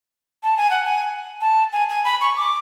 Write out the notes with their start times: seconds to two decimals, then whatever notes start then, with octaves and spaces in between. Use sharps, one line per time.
0.43 A5
0.57 G#5
0.70 F#5
0.85 G#5
1.41 A5
1.72 G#5
1.89 G#5
2.04 B5
2.21 C#6
2.37 D6